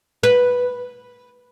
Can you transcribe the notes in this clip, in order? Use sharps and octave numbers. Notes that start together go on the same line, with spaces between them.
B4